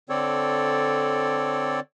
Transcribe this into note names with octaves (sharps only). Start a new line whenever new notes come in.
D3 C4 A4 C#5 D5